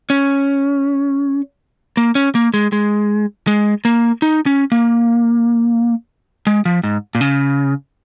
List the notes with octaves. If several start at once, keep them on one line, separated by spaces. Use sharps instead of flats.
C#4
A#3
C#4
A#3
G#3
G#3
G#3
A#3
D#4
C#4
A#3
G#3
F3
G#2
A#2
C#3